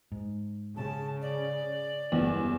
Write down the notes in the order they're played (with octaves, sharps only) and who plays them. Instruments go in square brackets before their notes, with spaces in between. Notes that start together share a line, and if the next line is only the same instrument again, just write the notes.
[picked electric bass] G#2
[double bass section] C#3 [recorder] A5
[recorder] D5
[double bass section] F#1 G3 [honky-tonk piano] E2